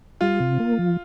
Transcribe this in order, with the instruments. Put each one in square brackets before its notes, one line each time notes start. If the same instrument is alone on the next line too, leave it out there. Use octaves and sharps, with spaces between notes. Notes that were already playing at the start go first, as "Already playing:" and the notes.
[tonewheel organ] G3 [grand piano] F4
[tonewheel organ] C3
A#3
F3